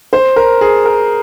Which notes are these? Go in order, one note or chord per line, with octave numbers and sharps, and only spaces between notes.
C5
A#4
G#4
A#4